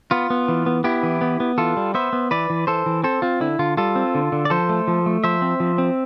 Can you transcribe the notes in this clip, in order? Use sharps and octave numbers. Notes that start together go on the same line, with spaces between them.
B3 F4
B3
E3
B3
B3 E4 G4
E3
B3
B3
E3 F4 A4
G3
B3 C5 E5
B3
E3 B4 D5
E3
E3 A4 C5
E3
C4 A4 C5
C4 F4
D3 E4
D3 F4
G3 F4 A4
C4
D3
D3
D5
F3 A4 C5
A3
F3
A3
F3 C5 E5
C4
F3
C4